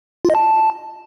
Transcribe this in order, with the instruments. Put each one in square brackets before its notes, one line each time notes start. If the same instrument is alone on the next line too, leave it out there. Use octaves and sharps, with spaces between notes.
[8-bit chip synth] F4
D#5
A5